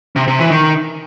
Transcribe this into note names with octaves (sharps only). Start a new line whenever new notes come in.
C3
C3
E3
D#3